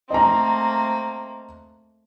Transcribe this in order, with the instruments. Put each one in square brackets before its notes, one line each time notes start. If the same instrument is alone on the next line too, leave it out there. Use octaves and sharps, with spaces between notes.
[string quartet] A3 A#3 C4 [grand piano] D#5 A#5